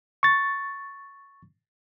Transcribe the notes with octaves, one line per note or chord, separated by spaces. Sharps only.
C#6 A6